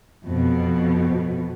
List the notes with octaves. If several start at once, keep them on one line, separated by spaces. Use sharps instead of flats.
F2 B2